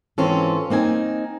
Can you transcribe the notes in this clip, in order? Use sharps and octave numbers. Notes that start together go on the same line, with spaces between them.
G#2 E3 C4 C#4 F4 A4
A#3 C4 D#4 G#5